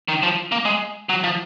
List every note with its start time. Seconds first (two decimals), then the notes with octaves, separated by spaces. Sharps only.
0.08 D#3
0.23 F3
0.52 A#3
0.65 G#3
1.09 F#3
1.24 F3